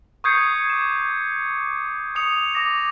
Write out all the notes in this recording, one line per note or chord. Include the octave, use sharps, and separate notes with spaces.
C#6 D#6 G6 G#6 C7 C#7
D6 E7
C#6 D#6 C#7 F7
D6 A#6